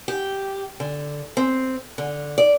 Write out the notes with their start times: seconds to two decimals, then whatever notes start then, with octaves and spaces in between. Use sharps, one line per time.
0.08 G4
0.80 D3
1.37 C4
1.98 D3
2.38 D5